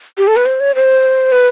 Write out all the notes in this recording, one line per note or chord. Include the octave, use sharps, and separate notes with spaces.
G4
A4
B4
C5
C#5
C5
B4